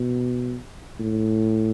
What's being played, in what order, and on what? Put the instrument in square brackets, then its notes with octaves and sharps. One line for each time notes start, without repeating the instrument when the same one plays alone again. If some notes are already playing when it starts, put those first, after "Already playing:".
Already playing: [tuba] B2
A2